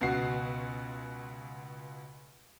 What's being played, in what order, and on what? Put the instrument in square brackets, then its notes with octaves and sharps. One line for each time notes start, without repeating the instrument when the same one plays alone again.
[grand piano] C#2 B2 F#4 C7